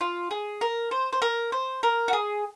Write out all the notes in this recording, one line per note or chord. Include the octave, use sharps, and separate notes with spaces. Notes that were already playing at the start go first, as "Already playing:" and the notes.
F4
G#4
A#4
C5
C5
A#4
C5
A#4
F#4
G#4